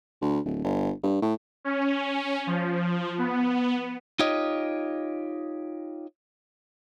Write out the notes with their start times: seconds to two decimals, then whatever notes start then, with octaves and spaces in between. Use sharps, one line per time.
0.22 D2
0.45 D1
0.64 G1
1.04 G2
1.22 A2
1.65 C#4
2.47 F3
3.18 B3
4.19 D#4 F4 G4 C#5 D#5